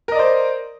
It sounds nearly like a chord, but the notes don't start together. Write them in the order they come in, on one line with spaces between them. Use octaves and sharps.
A#4 D#5 D5 C5